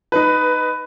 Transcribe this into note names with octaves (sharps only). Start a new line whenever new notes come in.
D#4 B4